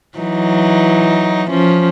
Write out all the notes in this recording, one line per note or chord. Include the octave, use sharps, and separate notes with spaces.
E3 F#3 D#4
F3 C#4